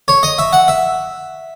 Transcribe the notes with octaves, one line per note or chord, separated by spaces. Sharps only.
C#5
D#5
E5
F#5
E5